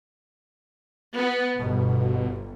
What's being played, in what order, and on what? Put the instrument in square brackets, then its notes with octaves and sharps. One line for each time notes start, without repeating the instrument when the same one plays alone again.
[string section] B3
[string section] G1 [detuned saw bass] B2